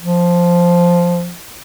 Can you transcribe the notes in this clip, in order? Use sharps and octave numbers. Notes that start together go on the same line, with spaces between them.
F3